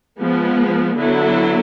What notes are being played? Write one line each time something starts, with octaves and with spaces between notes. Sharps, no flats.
F3 G#3 B3
D3 F#3 B3 E4 A4